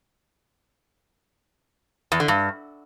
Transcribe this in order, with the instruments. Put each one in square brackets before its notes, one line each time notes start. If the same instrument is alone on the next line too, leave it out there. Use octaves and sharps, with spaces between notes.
[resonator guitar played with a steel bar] E2
D3
G2